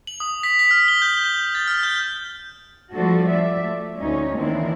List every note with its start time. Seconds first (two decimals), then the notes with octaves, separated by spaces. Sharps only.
0.07 F#7
0.20 D#6
0.43 B6
0.59 B6
0.71 F6
0.88 G7
1.02 G6
1.24 G6
1.55 A6
1.68 F6
1.83 G6
2.91 F3 G3 A3 D4 F#4 A4
3.28 D5 E5
3.61 A3
3.98 D2 C#4 D#4 C#5
4.36 D#3 E3 A#3 C4 D4 E4